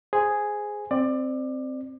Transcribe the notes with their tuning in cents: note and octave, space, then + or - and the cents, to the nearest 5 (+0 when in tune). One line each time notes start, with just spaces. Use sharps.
G#4 +0 C5 -10
C4 +0 D5 +20